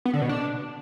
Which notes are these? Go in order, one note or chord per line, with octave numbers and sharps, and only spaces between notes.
B3
D3
B2
D4